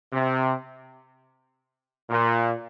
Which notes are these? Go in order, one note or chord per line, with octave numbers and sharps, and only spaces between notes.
C3
A#2